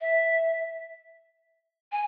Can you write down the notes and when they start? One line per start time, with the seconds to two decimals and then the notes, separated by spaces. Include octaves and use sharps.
0.01 E5
1.92 G#5